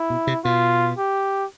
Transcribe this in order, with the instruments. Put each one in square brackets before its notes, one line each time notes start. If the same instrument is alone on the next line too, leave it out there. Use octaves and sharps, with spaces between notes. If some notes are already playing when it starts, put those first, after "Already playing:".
Already playing: [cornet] E4
[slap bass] B2
C3
[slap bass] B2 [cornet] F4
[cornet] G4